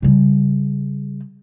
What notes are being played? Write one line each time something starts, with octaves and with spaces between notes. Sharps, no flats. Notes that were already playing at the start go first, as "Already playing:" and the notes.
C#3 G3